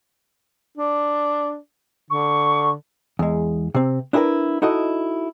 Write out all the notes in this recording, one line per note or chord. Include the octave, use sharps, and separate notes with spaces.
D4
D3 C#6
E2 G#3
C3 C4
D4 E4 G4 G#4 A#4 B4
D#4 E4 F#4 A4 D#5